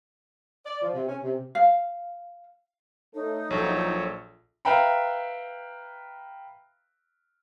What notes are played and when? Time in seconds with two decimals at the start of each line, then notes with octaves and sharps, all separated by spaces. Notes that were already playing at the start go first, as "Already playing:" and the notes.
0.66 D5
0.82 F3
0.94 C3
1.08 C#4
1.23 C3
1.55 F5
3.14 A3 D#4 A4 C#5
3.50 A#1 F3 F#3 A4 C#5
4.65 B4 E5 F5 G5 A#5 B5